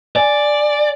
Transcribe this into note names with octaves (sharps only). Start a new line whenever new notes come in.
D5 G#5